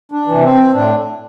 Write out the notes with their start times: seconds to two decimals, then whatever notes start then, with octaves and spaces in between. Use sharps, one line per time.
0.12 D4
0.27 C3 E3
0.43 C4
0.74 A2 D4